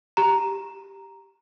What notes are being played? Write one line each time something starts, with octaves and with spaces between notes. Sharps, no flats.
G4 A#5